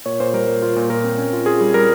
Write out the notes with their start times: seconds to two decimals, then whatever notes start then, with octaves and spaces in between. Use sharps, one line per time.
0.06 A#2 C#5
0.20 A#2 C5
0.33 G3 A#4
0.48 A#2
0.62 F4
0.76 A#2
0.90 A#2 A#4
1.04 C4
1.18 C#4
1.33 F4
1.46 F4 G#4
1.61 G3
1.74 G3 A#4